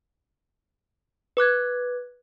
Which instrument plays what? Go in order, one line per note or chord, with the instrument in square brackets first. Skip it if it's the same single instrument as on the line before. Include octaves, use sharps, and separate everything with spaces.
[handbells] B4 D6 F#6 G#6